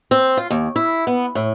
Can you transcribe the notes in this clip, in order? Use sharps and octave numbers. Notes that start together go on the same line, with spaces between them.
C4
F4
D#2
E4
B3
A2